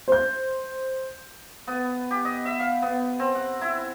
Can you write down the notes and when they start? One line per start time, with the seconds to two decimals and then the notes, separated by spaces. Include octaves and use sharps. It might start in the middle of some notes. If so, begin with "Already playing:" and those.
0.08 C5 G6
1.67 B3
2.11 G4
2.25 D#5
2.45 E5
2.59 F5
2.82 B3
3.19 C4
3.35 F#5
3.61 E4